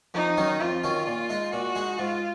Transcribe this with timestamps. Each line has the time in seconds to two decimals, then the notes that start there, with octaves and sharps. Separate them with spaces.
0.14 F2 D#4
0.37 D#3 F#3 C#4
0.61 F2 F4
0.84 D#3 F#3 C#4
1.07 A#2
1.29 G#3 D#4
1.52 A#2 F#4
1.75 G#3 D#4
1.98 G#2 F4